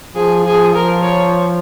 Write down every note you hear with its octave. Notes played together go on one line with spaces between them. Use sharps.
F3 G#4
F3 G#4
F3 A#4
C#5